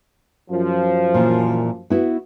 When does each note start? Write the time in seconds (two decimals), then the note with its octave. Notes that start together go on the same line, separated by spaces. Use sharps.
0.50 F#2 F3
1.14 A#2 E3
1.90 B3 E4 F#4